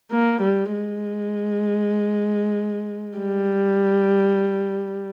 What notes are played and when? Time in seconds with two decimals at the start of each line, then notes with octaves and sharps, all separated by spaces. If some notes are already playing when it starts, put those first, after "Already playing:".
0.12 A#3
0.42 G3
0.73 G#3
3.18 G3